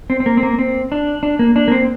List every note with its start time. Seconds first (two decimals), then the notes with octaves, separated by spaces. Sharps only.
0.10 C4
0.20 C4
0.26 A#3
0.37 C4
0.43 A#3
0.59 C4
0.92 D4
1.23 D4
1.39 A#3
1.56 D4
1.68 A#3
1.72 C4